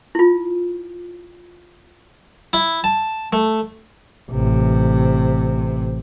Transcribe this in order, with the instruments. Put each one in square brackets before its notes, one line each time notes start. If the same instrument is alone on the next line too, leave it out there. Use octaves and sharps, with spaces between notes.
[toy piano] E4 F4
[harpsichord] E4
A5
A3
[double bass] A1 C3